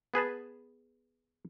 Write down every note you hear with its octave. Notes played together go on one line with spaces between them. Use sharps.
B3 G#4 B4 A5